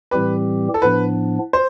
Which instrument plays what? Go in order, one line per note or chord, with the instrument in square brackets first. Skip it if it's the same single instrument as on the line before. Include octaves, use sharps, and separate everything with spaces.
[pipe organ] A2 E3 G3 C4 G4 [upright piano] B4
[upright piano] A4
[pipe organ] A2 F3 B3 D4 [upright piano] B4
[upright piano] C5